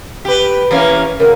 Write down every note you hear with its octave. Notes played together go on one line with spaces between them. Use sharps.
G4 B4
E3 A#3 C#4
C#3 F#3 A#4